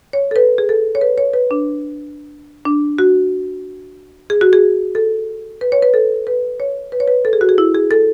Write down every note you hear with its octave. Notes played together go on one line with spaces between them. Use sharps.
C#5
A4
B4
G#4
A4
C#5
B4
C#5
B4
D4
D4
F#4
G#4
F#4
G#4
A4
B4
C#5
B4
A4
B4
C#5
B4
C#5
B4
A4
G#4
F#4
G#4
E4
G#4
A4